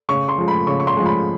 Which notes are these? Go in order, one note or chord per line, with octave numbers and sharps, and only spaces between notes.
C#3 C#6
C6
F3 G#3
B5
C#3 C#6
C#6
C6
F3 G#3
B5